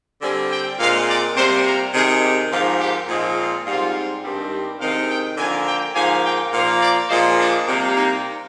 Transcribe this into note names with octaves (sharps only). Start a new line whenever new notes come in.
D3 G3 C4 G#5
G5
A#2 G#3 C4 F5
D5
C3 G3 A#3 C5
A#4
C3 D#3 G#3 G#4
G4
G#2 F3 A#3 F4
G4
A#2 F3 G#3 C4 G#4
F4
G#2 G3 C4 F4
G2 D#3 G3 C4
C3 D#3 G#3 F5
G5
D3 F3 A#3 G#5
G5
G#2 F3 A#3 G#5
G5
A#2 F3 A#3 F5
D5
A#2 F3 G#3 C5
D4
C3 G3 A#3
D#4